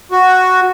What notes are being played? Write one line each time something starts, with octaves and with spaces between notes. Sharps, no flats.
F#4